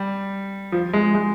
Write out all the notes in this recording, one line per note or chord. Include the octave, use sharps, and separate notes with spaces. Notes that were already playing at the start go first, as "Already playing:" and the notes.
Already playing: G3
F3
G#3
G#3